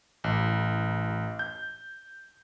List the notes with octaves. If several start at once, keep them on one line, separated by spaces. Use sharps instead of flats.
A1
G6